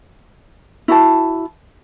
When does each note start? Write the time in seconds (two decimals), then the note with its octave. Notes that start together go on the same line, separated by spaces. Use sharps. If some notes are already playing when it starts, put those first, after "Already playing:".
0.88 E4 F#4 A5